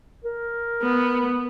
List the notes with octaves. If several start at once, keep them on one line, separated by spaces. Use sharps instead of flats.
A#4
B3